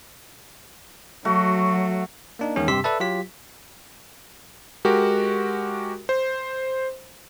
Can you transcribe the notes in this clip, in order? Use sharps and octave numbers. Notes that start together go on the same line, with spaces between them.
F#3 A3 F#4
A#3 D4 D#4
E2 D#3 G#3 C#4
G2 C3 G4 C6 E6 B6
A4 B4 D5 E5 A5
F#3 F4 G4 B6
G#3 F#4 G4 A#4
C5